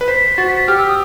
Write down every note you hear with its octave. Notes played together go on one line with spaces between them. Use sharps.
B4
C5 B6
F#4 A6
B6
G4 F6
E6
D#6